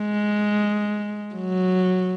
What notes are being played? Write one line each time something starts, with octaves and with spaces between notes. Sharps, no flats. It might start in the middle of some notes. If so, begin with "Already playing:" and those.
Already playing: G#3
F#3